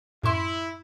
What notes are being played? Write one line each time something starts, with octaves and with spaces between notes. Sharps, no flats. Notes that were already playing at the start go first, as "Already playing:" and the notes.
F#2 A2 E4 C6